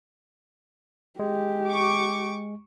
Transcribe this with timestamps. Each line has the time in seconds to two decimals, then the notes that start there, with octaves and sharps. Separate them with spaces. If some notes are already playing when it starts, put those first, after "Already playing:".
1.19 G#3 G4
1.68 C#6 D6